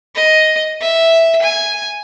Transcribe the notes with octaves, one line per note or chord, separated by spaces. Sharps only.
D#5
E5
G#5